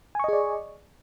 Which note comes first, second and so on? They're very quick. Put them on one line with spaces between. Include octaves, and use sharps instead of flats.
G#5 C#6 D#5 G#4 D5